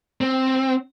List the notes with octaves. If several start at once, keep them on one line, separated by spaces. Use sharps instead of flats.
C4